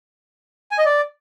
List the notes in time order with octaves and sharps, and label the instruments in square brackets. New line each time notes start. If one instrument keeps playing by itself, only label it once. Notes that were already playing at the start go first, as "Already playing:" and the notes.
[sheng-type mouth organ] G#5
D#5
D5